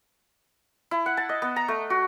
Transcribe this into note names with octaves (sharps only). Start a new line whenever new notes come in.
E4
F#5
A5
D#5
B3
A#5
A3
F#4